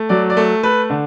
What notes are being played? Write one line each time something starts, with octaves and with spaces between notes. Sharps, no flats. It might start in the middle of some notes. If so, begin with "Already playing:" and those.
Already playing: A3
F#3 D5
D5
A3
A3 B4
D3